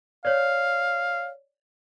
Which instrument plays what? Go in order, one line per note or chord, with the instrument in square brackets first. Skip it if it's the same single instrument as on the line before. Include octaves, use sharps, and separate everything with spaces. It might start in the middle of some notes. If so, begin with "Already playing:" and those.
[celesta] C#5 D5 [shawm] F5